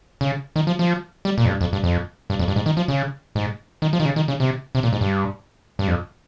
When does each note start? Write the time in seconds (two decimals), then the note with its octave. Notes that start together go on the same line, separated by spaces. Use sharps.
0.21 C#3
0.56 D#3
0.67 F3
0.79 F3
1.25 G3
1.38 A#2
1.45 F2
1.49 G2
1.61 F2
1.73 G2
1.84 F2
2.30 G2
2.39 F2
2.48 G2
2.56 G#2
2.66 D#3
2.77 F3
2.88 C#3
3.35 G#2
3.82 D#3
3.93 F3
4.00 D#3
4.05 C#3
4.16 D#3
4.28 C#3
4.40 C3
4.75 C3
4.83 A#2
4.93 G#2
5.01 G2
5.79 G2
5.88 F2